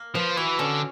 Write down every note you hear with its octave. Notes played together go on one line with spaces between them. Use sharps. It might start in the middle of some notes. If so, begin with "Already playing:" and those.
Already playing: A#3
F3 B4
E3 F#4
D3 C#4